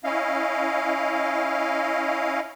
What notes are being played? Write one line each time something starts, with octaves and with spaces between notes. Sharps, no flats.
C#4 E4 D#5 F5